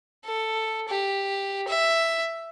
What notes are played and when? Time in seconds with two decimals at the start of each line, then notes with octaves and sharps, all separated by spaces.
0.25 A4
0.88 G4
1.68 E5